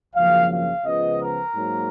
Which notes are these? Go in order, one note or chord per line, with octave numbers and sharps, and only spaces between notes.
G#1 F#2 C#3 F3 A#3 F5
F5
C#2 C#3 F3 B3 D#5
A#4
G#2 F#3 A#3